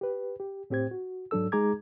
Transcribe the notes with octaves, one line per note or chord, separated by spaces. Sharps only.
G4 B4
G4
A2 C4 G4 C5 G#6
F#4
G#2 F#3 D4 A4 E6
G#3 D#4 G#4 A#5 D6 G#6